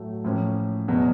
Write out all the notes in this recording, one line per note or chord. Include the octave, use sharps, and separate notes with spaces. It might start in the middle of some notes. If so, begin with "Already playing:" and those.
Already playing: A2 F#3 A3
A2 F3 A#3 C#4
E2 B2 F#3